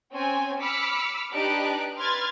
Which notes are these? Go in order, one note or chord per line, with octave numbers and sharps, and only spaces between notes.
C4 C#4 C#5 G5 G#5
B5 D6 E6 F6 B6 C#7
D4 D#4 G4 B4 F#6 D7
B4 C6 F6 G#6 A6